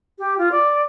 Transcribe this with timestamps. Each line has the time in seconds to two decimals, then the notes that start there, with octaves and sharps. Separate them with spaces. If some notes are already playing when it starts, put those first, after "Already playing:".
0.19 G4
0.38 F4
0.52 D5